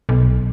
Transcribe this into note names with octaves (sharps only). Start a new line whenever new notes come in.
B1